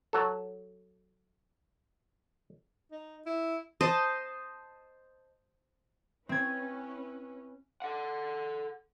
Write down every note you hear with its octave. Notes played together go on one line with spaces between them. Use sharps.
F#3 A4
D#4
E4
C5 D#5 A5
C4 C#4 E4 B4 G#6
A4 F#5